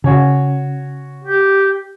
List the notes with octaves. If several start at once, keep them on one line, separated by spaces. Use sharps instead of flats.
C#3 F#4 C#5 G#5
G4